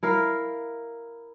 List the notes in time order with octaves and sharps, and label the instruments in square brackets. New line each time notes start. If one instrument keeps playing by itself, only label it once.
[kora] E4 A#4 F5